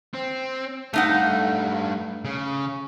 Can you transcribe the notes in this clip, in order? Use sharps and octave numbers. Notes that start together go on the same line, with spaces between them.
C4
G2 A3 D#4 F5 F#5
C#3